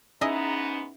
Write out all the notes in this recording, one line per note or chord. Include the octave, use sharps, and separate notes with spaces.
G#2 B3 C#4 D#4 E4 G#4 D#5 A#5